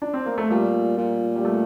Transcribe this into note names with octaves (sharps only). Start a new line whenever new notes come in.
D4
C4
A#3
A3
A#2 G3
A#2
G3
A3